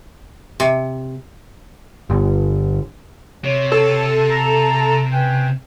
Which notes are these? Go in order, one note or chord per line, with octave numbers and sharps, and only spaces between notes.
C3
G1
C3 C#5
A4
A#5
C#4 B4 G5